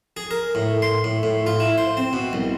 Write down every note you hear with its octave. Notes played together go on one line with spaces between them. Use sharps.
G#4
A#4
A2
C6
A2
A2
F4
E4
C5
C4
B2
C2